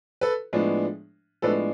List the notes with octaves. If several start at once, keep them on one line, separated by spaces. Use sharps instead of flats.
A4 B4
A2 F3 G#3 B3 D4
A2 F3 G#3 B3 D4 A4 B4